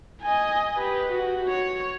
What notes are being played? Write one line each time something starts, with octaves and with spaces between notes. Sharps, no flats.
D#5 G#5
G4 B4
F#4
C#5